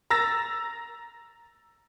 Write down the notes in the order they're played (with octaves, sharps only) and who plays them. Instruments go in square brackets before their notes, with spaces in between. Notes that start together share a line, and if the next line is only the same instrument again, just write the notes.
[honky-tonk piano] A#5 E6 A6 A#6